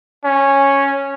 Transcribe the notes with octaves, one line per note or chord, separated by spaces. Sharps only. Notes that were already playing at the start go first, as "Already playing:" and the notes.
C#4